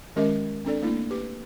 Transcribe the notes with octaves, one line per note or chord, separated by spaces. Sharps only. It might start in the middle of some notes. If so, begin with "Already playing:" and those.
D#3 G#3 C#4 G4 A#4 D#5
C4 D4 A4 D5
A3 A#3 D4 E4
G4 B4